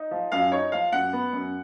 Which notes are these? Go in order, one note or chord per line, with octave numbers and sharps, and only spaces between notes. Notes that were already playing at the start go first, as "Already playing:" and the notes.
Already playing: D#4
F3
F#2 F5
D#4 C#5
F3 F5
F#2 F#5
B3
F#2